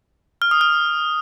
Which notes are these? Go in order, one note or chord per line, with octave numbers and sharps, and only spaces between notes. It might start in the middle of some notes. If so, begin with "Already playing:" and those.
F6
D#6
F6